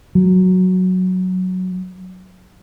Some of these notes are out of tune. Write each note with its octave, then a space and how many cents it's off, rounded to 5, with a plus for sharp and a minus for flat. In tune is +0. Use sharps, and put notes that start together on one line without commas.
F#3 +0